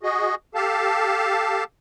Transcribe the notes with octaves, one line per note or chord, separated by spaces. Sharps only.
F#4 G#4 D#5
G4 A4 F5 A5